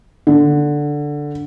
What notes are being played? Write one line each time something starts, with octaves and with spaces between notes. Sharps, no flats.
D3